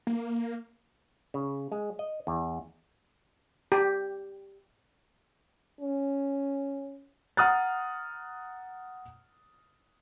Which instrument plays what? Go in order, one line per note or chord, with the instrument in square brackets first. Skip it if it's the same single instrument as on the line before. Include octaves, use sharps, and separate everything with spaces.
[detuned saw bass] A#3
[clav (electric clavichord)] C#3
G#3
D#5
E2
[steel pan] G4
[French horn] C#4
[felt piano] F#5 A#5 D#6 F6 F#6 A6